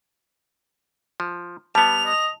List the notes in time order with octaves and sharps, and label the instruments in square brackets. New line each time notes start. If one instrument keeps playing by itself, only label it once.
[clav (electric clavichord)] F3
[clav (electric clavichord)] G3 B3 [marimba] A5 [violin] F7
[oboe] D#5